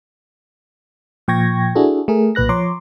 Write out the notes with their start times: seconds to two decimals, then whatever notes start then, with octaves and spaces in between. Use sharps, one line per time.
1.28 A#2 F3 G5 C#6 G#6 A#6
1.75 D4 E4 F#4 G#4 A4
2.08 A3 G#4 A#4
2.35 B1 A#2 B4 F#6 A#6
2.49 F3 C#5 A#5 C6 D6